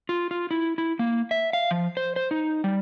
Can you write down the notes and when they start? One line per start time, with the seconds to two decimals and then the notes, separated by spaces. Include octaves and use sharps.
0.09 F4
0.31 F4
0.51 E4
0.78 E4
0.99 A#3
1.31 E5
1.53 F5
1.71 F3
1.97 C5
2.16 C5
2.31 D#4
2.64 G3